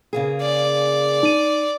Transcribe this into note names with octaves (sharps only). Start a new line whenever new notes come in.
C#3 A#3 G#4
D5
D#4 D#7